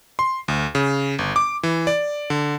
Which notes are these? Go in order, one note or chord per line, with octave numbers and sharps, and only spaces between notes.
C6
D2
C#3
G1
D6
E3
D5
D3